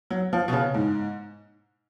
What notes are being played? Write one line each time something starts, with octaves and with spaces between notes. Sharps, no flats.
F#3
F3
B2
C#3
G#2